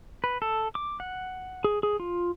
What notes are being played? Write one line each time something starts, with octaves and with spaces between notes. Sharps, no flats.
B4
A4
D6
F#5
G#4
G#4
F4